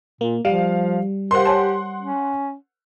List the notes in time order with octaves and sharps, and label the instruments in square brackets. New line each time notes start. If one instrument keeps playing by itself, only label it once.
[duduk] A#2 [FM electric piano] A#3
[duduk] F3 [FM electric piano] G3 [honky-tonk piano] F5
[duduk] G4 [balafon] A#4 C5 F5 [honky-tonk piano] F#5 C6
[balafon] C#5 G#5 A5
[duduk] C#4